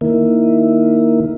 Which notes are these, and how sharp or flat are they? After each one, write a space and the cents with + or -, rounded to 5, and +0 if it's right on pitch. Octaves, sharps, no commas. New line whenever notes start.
D#3 +0 A#3 +0 E4 +0